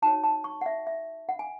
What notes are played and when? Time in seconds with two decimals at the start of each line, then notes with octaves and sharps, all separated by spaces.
0.02 D#4 F#4 C#5 A5
0.24 A5
0.44 C#6
0.61 F#5
0.66 E5
0.87 E5
1.29 F#5
1.39 G#5